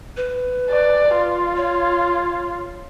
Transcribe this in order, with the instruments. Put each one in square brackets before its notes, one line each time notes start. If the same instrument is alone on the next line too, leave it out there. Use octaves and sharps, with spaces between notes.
[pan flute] B4
[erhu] D5
F4
[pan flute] C#5